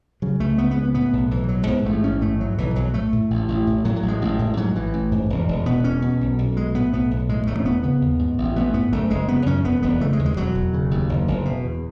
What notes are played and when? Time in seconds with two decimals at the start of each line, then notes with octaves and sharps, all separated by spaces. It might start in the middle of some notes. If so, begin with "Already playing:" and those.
0.22 C#3 F#3
0.40 C#2 A3
0.58 C#2 B3
0.71 B3
0.76 C#3
0.83 B3
0.94 A2 B3
1.13 B1
1.31 B1 E3
1.48 A2 F#3
1.67 G#2 B3
1.85 A1 A3
2.04 A1 C#4
2.21 G#2 A3
2.40 A2 F#3
2.58 B1 E3
2.76 B1 F#3
2.94 A2 A3
3.12 A2
3.30 A1
3.48 A1
3.67 A2
3.85 A2 F#3
3.96 F#3
4.02 A1
4.08 G#3
4.21 A1
4.39 A2
4.57 G#2 F#3
4.75 A1 E3
4.94 A1
5.12 G#2
5.30 E1
5.48 E1
5.66 B2 B3
5.84 E2 C#4
6.02 B2
6.21 B1
6.38 B1
6.56 B2 G#3
6.74 A2 B3
6.93 B1 B3
7.11 B1
7.29 A2 G#3
7.47 E1 A3
7.60 C#4
7.65 E1 B3
7.83 C#3 B3
8.01 D#2
8.19 G#2
8.38 A1
8.56 A1 B3
8.74 G#2 B3
8.92 F#1 A3
9.10 F#1 G#3
9.28 C#3 B3
9.46 F#2 C#4
9.64 E1 B3
9.83 E1 B3
10.01 C#3 A3
10.13 G#3
10.19 D#2
10.25 G#3
10.37 E1 F#3
10.55 E1
10.73 C#3
10.91 D#2
11.09 F#1
11.28 F#1
11.45 B2
11.64 E2